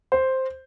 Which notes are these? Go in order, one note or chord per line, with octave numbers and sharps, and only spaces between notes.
C5